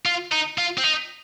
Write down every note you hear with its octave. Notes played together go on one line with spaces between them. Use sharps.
F4
D#4
F4
C4
D#4